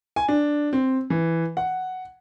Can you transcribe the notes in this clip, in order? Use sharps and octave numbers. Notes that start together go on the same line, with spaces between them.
G#5
D4
C4
E3
F#5